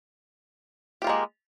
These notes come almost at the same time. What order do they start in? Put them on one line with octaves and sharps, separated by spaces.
G4 F4 A#3 G#3